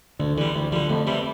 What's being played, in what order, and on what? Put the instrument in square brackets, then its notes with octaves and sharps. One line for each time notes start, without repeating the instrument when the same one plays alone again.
[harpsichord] D2 [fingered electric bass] D3
[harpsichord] D3 G3 [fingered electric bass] E3
[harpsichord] D2 [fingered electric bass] E3
[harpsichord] D3 G3 [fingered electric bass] F3
[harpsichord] F2 [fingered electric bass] A3
[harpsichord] C3 E3 G3